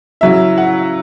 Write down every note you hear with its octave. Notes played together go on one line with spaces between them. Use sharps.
C#3 F#3 C#4 E4 E5
F#5